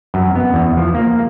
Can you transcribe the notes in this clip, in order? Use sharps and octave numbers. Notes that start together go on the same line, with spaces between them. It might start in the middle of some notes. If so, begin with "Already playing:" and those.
F#2
B3
E2
F3
A#3